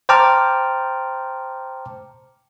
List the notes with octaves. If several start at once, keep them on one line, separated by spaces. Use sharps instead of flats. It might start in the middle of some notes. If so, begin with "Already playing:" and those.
C5 G5 A5 A#5 D6 F6